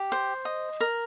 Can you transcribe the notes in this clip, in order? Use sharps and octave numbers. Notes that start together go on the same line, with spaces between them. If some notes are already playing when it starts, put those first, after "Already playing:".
Already playing: G4
C5
D#5
A#4